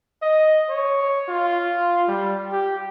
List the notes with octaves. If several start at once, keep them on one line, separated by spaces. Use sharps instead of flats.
D#5
C#5
F4
G3
G4